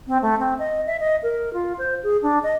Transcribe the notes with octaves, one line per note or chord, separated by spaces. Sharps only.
C4
A3
C4
D#5
E5
D#5
A#4
F4
C5
G#4
D4
D#5